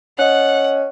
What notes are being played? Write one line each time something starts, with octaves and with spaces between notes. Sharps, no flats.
C#4 D#5 F#5 F#6